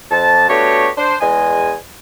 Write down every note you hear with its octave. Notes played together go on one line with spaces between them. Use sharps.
F2 A5
A3 B3 D4 F#4 G4 C#5
D4 C5
E2 G#3 D#5 G#5